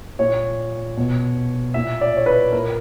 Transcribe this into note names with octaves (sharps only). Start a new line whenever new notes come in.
A#2 C#5
B2
A#2 E5
D5
C#5
B4
A#2 A#4